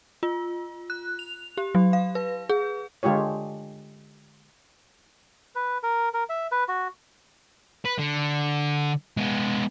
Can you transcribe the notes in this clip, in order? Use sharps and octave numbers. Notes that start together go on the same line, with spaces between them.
F4
F#6
F7
G4
F#3
F5
B4
G#4
D3 G#3 F4 G4 C#5
B4
A#4
A#4
E5
B4
F#4
B4
D3
G#3 B3